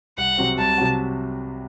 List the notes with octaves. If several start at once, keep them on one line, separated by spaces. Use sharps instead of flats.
C2 F#5
C3 F#3 C4 F#4
C2 A5
C3 F#3 C4 F#4